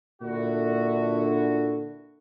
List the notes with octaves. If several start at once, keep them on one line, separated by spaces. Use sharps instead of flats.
A#2 D3 E4 F#4